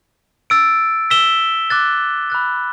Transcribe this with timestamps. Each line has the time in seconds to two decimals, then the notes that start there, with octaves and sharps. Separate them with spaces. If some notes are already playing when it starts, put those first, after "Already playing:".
0.50 E6 A6 D7
1.10 E6 B6 E7 G7
1.70 D6 F#6 A6
2.30 B5 F#6 A6